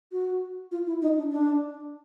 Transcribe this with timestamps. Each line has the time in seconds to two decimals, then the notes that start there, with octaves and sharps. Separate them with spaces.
0.12 F#4
0.72 F4
0.87 E4
1.02 D#4
1.17 D4
1.31 D4